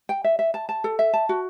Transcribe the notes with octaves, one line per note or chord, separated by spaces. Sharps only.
G5
E5
E5
A5
A5
A4
E5
A5
F#4